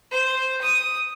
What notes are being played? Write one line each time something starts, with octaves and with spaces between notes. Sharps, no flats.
C5
D#6